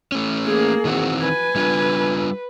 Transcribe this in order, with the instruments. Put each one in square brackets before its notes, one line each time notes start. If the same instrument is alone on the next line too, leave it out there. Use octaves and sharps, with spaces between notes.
[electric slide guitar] A3 C#4
[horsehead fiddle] A#3 G#4
[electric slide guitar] D#3 E3 C4 [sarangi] F#4
[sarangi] B4 [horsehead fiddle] G#5
[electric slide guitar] G3 D4 F4